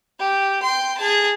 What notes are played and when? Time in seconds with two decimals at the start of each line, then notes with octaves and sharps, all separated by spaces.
0.20 G4
0.62 G5 C6
0.98 G#4 A5